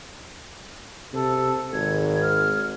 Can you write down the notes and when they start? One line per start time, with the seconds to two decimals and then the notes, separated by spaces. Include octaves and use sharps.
1.13 C3 A4
1.73 G#1 G#6
2.22 F6